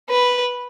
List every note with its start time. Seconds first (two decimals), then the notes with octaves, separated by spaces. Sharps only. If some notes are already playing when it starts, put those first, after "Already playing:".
0.09 B4